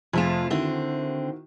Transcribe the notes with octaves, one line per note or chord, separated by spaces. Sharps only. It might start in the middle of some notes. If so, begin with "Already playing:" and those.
F2 C3 A3 F4 G#4 E7
D3 D#3 C4 E4 F#4